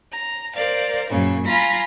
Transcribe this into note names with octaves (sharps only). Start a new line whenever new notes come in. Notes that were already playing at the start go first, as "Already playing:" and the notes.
A#5
A#4 C5 D5 F5
F#2 A#2 C#3
F4 G#5 A#5 B5